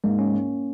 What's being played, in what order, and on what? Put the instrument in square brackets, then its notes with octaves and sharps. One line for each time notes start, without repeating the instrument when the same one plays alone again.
[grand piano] G#2 [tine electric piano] A#3
[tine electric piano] C#4